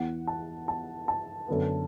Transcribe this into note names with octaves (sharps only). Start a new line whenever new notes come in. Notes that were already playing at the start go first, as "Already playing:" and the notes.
Already playing: E2 E3 B3 F#5
A5
A5
A5
F#2 D3 B3